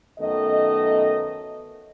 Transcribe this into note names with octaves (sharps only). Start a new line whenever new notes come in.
F#2 D#3 A3 B3 D#5